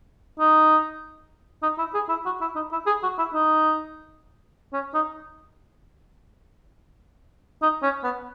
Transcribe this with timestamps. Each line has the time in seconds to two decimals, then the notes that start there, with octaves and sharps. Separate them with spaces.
0.40 D#4
1.63 D#4
1.78 E4
1.94 G#4
2.09 E4
2.26 F#4
2.41 E4
2.55 D#4
2.72 E4
2.86 G#4
3.03 F#4
3.18 E4
3.33 D#4
4.73 C#4
4.94 D#4
7.62 D#4
7.83 C#4
8.04 B3